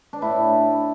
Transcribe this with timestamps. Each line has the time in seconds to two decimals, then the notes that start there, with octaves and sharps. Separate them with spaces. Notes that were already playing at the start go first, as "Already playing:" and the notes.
0.13 D4
0.22 A2 E4